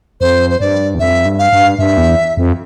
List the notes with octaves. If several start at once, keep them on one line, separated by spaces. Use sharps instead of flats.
F2 C5
C5
G2 D5
E2
F2 E5
G2
F5
G2
G2 E5
E2
F2